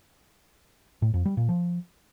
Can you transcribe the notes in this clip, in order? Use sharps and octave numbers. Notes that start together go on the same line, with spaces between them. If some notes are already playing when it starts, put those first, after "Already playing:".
A2
F2
G3
A#2
F3